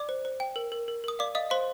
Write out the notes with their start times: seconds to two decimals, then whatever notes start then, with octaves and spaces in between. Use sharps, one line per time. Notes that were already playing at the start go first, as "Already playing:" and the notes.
Already playing: D5 D6
0.09 C5
0.25 C5
0.40 G5
0.56 A#4
0.72 A#4
0.88 A#4
1.04 A#4 D#6
1.19 D5 F5 D6
1.35 D#5 F5 D#6
1.50 C5 F5 C6